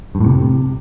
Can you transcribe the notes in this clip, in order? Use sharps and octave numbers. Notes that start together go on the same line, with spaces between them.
G2
A2
C3